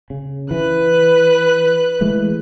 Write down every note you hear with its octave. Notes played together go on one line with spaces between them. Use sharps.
C#3
E3 B4 F#6
E3 G#3 A3